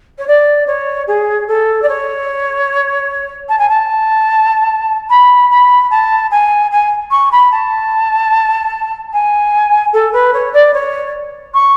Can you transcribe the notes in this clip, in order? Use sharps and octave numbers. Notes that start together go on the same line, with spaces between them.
C#5
D5
C#5
G#4
A4
D5
C#5
A5
G#5
A5
B5
B5
A5
G#5
G#5
C#6
B5
A5
G#5
A4
B4
C#5
D5
C#5
C#6